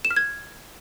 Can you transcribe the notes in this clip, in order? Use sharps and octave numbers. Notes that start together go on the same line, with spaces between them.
E7
F6
G#6